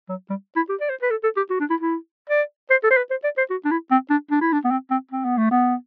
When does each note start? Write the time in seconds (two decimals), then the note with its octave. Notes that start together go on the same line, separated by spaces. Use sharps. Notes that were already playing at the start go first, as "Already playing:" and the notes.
0.09 F#3
0.30 G3
0.56 E4
0.69 G4
0.80 D5
0.89 C5
1.02 B4
1.10 A4
1.23 A4
1.37 G4
1.50 F#4
1.60 D4
1.70 E4
1.80 E4
2.29 D5
2.70 C5
2.83 A4
2.90 C5
2.97 B4
3.10 C5
3.24 D5
3.37 C5
3.50 F#4
3.65 D4
3.71 E4
3.91 C4
4.10 D4
4.31 D4
4.41 E4
4.52 D4
4.64 B3
4.70 C4
4.91 C4
5.11 C4
5.24 B3
5.37 A3
5.51 B3